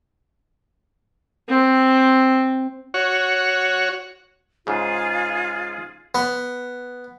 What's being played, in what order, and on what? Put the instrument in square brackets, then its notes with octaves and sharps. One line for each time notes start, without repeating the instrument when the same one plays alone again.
[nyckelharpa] C4
[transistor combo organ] F#4 C#5
[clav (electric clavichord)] G#2 C#3 [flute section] F4 G#4
[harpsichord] B3